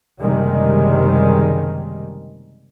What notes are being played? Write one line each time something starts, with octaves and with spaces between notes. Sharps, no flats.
F#1 C3 D#3 G3 G#3